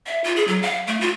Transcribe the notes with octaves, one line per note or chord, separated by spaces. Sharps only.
E5
F4
G#4
F#3
F5
A3
F4